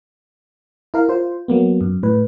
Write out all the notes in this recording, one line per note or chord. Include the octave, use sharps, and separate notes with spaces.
E4 A#4 F5
F4 C5
F#3 A#3 B3
F#2
A2 B4